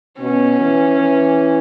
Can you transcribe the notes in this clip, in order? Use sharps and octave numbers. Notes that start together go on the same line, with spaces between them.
B2 C#4
E3
E3